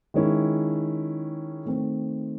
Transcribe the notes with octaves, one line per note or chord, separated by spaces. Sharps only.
D#3 G#3 C#4 E4
D#3 A3 C4